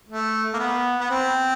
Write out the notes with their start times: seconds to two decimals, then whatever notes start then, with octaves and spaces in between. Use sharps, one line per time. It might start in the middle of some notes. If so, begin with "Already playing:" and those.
0.09 A3
0.54 A#3
0.59 B3
1.00 B3
1.10 C4